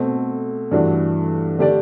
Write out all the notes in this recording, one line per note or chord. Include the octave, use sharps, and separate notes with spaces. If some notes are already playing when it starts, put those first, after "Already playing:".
Already playing: B2 A3 C4
G2 E3 A3 D4 F#4
D3 A3 D4 G4 D5